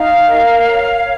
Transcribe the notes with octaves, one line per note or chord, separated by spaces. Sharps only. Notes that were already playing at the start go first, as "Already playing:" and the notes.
Already playing: D#4 F5
A#4
C#5